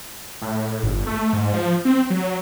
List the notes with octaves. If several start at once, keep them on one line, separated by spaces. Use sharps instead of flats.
A2
G1
A3
G#2
F3
C4
F#3